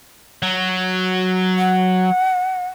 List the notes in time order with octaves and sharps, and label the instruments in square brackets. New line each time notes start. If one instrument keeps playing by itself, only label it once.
[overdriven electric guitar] F#3
[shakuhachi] F#5